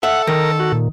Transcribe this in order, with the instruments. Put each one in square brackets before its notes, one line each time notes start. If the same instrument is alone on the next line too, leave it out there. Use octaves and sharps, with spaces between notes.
[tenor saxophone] A4 [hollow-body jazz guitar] E5 [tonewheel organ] F#5
[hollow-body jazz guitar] D#3 [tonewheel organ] A#4
[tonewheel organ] F#4
A#2